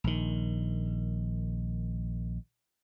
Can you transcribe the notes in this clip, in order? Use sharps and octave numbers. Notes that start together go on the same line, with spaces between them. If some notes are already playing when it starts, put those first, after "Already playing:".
A#1 D#3